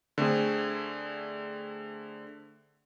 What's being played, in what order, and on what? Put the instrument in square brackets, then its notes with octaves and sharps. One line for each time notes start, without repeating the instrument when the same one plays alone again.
[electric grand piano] D3 A3 C4 G#4